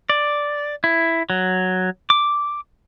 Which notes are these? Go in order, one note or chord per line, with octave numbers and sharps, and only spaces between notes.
D5
E4
F#3
D6